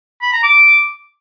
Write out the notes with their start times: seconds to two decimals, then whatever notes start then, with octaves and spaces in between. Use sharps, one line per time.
0.22 B5
0.33 A#5
0.43 D6